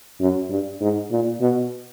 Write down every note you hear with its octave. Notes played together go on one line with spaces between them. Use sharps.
F#2
G2
G#2
A#2
B2